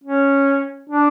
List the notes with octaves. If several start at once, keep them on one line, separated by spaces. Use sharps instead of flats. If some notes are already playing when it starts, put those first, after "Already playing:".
C#4
D4